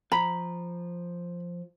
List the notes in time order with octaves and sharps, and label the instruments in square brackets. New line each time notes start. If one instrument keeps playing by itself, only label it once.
[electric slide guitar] F3 [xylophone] A#5 B6 [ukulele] B5